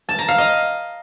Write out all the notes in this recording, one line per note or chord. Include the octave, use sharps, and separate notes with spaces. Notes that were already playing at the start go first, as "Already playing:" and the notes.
A5
A#5
F5
D#5